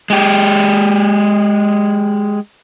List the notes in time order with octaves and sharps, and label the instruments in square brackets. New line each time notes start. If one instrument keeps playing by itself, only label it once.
[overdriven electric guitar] G#3 G4